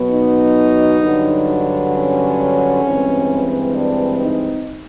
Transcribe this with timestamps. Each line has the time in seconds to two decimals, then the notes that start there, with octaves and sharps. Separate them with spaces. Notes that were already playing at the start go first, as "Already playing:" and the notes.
Already playing: B2 F#3 B3
0.10 D#4
1.01 G2 D3 F#3
1.92 C#4
2.83 G2 E3 G#3 C4
3.73 D4
4.18 D#4